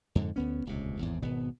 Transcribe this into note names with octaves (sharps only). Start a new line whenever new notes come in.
F2 G#2 D3
D2 B3 C#4
D#1 C#2 C3
G#1 E2 A2
G#1 B2 B3